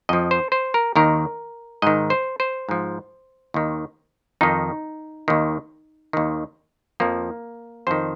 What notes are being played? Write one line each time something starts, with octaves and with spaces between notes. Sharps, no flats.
F2 F3 D#5
C5
C5
A#4
D#2 D#3 A#4
G#2 D#3 D#5
C5
C5
G#2 F3
D#2 D#3
F2 D#3 D#4
D#2 D#3
D#2 D#3
F2 F3 A#3
F2 D#3 C5